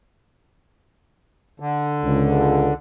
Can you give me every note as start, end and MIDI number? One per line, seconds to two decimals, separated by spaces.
1.60 2.73 50
2.03 2.69 37